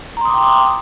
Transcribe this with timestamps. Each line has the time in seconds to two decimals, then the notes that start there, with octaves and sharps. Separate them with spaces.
0.17 A#5
0.21 C6
0.25 D#6
0.30 D6
0.34 G5